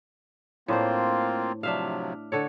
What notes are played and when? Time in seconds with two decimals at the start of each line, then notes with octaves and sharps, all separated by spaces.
0.68 A2 A#3 C4 D4 F4 C5
1.63 C3 F3 F#3 D4 E5 F5
2.32 D3 A4 C#5